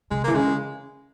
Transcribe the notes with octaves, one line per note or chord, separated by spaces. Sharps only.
C3 G#3
E3 A#3
C#3 G#3